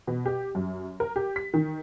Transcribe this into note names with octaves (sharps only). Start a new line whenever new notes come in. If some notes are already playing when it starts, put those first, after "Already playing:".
B2
G4
F#2
A#4
G4
B6
D#3